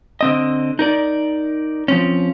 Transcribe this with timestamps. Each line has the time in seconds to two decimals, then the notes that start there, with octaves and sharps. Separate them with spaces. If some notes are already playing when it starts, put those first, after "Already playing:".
0.21 D3 C4 D#5
0.79 D#4 A#4 D5
1.88 F3 C4 C#4